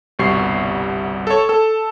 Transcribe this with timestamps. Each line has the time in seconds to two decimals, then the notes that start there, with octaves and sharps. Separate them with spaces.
0.19 G1 C2 B2 G3 C#6 C7
1.27 A4 C#5
1.49 A4 E6